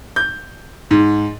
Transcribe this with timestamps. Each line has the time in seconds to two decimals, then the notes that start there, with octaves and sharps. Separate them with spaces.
0.16 G6
0.91 G#2